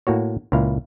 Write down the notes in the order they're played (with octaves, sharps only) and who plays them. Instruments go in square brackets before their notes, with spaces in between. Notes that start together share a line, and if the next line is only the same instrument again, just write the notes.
[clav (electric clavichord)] A2 A#3 F#4 C#5
C#2 A#2 E4 F5